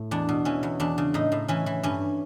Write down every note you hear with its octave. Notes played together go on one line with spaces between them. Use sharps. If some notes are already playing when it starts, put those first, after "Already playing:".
Already playing: A2
E2 D4
B2
E3 C#4
E2
E2 D4
C#3
A2 D#4
A2
E3 C#4
E3
G2 C#4